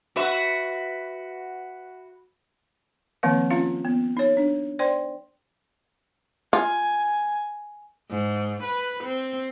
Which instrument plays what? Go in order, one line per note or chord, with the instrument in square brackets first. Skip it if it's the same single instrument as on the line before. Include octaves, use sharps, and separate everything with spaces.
[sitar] F#4 B4 E5
[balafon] D#3 F3 A#3 C4 F5
C#4 F4 F5
B3
D#4 C#5
D4
C5 D5 G5 C6
[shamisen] F4 [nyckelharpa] G#5
[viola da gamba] G#2
B4
C4